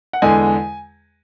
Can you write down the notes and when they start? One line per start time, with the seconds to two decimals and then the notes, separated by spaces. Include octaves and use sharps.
0.13 F#5
0.22 E2 D3 G#3 G#5